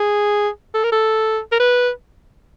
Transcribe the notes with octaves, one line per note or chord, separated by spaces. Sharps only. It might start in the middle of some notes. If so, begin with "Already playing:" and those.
Already playing: G#4
A4
A#4
A4
A#4
B4